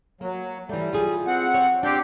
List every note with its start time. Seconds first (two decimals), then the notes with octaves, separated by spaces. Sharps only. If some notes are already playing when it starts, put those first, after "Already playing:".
0.21 F#3 A#3
0.69 E3 G3 A3
0.93 F4 G#4
1.27 C4 F#5
1.54 C#5
1.83 C4 D4 G4 G5